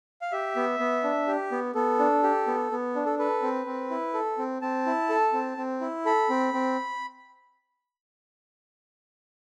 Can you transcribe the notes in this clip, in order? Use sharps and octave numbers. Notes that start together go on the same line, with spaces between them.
F5
G4 E5
B3
B3
D4
G4
B3
B3 A4
D4
G4
B3
B3
D4
A4
A4 B4
C4
C4
E4
A4
C4
C4 A5
E4
A4
C4
C4
E4
A4 B5
C4
C4